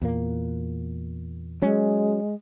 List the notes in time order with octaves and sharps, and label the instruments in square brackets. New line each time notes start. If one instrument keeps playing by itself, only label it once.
[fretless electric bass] E2 A#2 A#3
[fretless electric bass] F#3 C#4 [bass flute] G#3